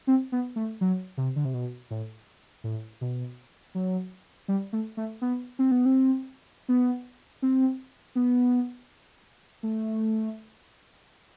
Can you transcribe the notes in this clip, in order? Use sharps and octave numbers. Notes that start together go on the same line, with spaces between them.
C4
B3
A3
F#3
C3
D3
C3
B2
A2
A2
B2
F#3
G3
A3
A3
B3
C4
B3
C4
B3
C4
B3
A3